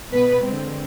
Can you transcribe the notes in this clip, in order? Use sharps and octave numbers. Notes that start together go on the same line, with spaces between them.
B2 B3 B4
D3 G#3 C4